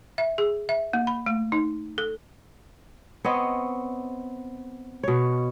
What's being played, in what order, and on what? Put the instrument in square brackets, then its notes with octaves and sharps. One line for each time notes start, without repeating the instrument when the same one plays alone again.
[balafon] E5
G#4
E5
A#3
B5
A3
D#4
A4
[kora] B3 C4 C#5 D#5
B2 C#5